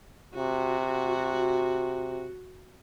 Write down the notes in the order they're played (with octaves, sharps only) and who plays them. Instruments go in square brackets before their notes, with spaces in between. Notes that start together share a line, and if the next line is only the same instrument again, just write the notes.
[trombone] C3 [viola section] F#4